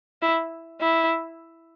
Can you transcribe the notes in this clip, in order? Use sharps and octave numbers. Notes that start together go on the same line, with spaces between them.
E4
E4